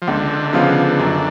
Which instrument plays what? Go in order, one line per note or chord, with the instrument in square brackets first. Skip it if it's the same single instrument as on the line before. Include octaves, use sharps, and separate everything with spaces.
[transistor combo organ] F3
[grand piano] C#2 [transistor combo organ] D3
[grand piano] C#3 F3 B3 F4
F#2